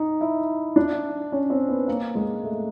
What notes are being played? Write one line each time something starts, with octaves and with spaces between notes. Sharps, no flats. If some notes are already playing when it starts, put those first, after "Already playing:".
Already playing: D#4
E4
D4
C#4
C4
B3
A#3
G#3
A3